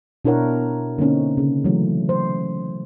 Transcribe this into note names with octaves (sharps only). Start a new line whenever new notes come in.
B2 D4 E4 A#4 C#5 F#5
D3 A#3 C4 C#4 D#4
C#3
E3 F#3 A3
C5